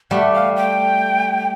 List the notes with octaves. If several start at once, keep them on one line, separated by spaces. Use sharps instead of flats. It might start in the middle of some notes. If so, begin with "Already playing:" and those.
G3 A3 F#5
F5
G5